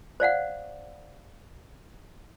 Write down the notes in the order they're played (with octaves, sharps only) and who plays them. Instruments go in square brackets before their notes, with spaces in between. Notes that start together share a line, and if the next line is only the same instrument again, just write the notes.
[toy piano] C5 D5 F5 F#5